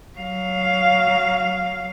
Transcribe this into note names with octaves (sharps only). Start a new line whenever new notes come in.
F#3 F5